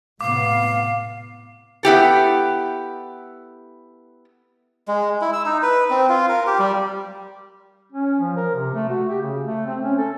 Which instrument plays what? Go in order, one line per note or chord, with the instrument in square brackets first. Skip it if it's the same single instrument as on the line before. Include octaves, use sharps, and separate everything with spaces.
[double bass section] A2 C3 B3 [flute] F5 [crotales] D6
[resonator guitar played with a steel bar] B3 E4 G4 A4
[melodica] G#3
E4
E6
D#4
B4
C4
F4
A#4
G4
G3
[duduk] C#4
F3
A#4
C3
A3
F#4
G4
C#3
A3
C4
C#4
A4